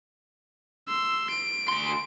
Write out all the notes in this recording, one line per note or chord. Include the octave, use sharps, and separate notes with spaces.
C6 E6
D7
D2 C6